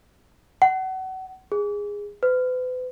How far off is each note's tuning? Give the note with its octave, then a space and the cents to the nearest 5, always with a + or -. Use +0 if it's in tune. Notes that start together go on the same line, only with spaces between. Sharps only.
F#5 +30
G#4 -15
B4 +40